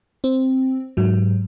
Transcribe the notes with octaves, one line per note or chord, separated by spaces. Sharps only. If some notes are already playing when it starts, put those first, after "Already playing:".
C4
G#2 F#3